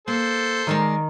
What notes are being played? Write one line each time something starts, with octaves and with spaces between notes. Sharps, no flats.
A#3 A4 C5
D#3 G#3 A#4 D5